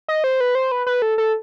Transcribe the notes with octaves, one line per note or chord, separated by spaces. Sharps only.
D#5
C5
B4
C5
B4
B4
A4
A4